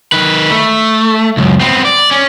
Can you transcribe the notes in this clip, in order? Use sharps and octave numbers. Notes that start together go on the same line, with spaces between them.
D#3 B4
A3
C#2 F#2
B3 C4
D5
C#4